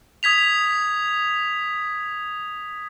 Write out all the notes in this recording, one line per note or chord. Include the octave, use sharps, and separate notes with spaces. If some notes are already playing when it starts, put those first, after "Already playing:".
D#6 G#6 B6 F7